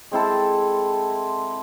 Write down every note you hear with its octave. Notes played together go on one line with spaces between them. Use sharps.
G#3 C4 E4 A4